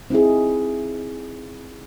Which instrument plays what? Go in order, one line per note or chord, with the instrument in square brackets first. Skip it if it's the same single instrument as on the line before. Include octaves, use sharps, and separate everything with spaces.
[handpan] C4 D#4 E4 G#4